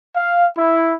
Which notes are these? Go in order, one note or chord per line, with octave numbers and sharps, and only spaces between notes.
F5
E4